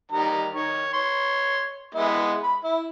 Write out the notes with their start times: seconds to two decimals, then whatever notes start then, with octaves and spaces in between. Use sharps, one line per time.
0.12 D#3 G3 A#5
0.53 D#3 C#5
0.93 C#5 C6
1.95 G#3 B3 E4
2.43 B5
2.64 E4